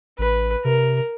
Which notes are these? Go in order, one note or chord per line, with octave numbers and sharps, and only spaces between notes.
A1 B4
C3 A#4